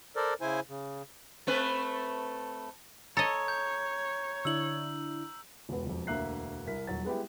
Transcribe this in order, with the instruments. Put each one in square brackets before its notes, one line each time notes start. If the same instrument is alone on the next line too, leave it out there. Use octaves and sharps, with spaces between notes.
[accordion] A4 A#4 C5 D5
C#3 E4 C5 G#5
C#3
[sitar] A3 C4 B4
[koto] A4 D#5 [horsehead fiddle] C#5 [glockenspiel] A#5
[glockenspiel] G6
[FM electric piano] D3 D4 E4 [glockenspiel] E6 F#7
[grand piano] E1 C#2 B3
E1 F2
E1 D2 A#3 E5 F#6 C7
C2 E4 A#4 B6
D#1 F#3 A6
G#3 B3 E4 G4